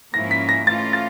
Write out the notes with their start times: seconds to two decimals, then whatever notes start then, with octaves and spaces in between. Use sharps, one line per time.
0.13 G#2 F3 A#3 C#4 E4 A#6
0.31 B6
0.49 A#6
0.66 E3 A3 C#4 F4 A6
0.93 A6